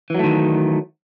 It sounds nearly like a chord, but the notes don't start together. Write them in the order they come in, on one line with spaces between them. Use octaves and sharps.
E3 F#3 A3 D#3